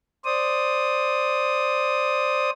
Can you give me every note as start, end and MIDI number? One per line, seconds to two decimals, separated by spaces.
0.25 2.50 72
0.25 2.50 74
0.25 2.50 87